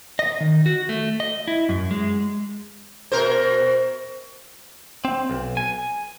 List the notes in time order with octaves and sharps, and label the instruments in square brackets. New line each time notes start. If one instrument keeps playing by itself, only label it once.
[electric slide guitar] D#5
D#3
F#4
A3
D#5
E4
F#2
G#3
[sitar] B2 A#4 C5
[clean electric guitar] C4
B1
G#5